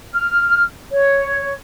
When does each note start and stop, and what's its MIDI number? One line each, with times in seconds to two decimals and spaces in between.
0.14 0.62 89
0.91 1.53 73